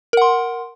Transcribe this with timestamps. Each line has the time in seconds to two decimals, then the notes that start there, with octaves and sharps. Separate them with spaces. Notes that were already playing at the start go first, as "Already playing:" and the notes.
0.13 A#4
0.17 F#5
0.22 C6